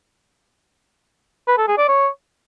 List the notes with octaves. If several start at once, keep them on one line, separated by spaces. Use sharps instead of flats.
B4
A4
G#4
D5
C#5